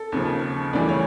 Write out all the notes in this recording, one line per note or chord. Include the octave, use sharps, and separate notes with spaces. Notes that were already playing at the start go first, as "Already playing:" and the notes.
Already playing: A4
D#2 C#3 F3
D2 C#3 E3 G3 D5
C#5